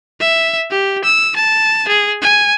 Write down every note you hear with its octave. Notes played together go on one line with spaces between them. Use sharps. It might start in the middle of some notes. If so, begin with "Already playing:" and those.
E5
G4
E6
A5
G#4
G#5